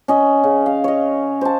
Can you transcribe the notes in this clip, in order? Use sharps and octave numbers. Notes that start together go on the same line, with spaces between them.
C#4 D#5
C#3
F5
C#5 D#5
C5 A5